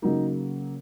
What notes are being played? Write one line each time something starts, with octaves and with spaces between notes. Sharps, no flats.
C#3 F#3 A#3 D#4